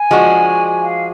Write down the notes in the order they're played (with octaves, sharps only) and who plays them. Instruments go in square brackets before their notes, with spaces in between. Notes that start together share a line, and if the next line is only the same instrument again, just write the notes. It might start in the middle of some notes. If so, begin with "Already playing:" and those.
Already playing: [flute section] G#5
[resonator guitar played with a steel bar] F3 G#3 D4 F#4
[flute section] F5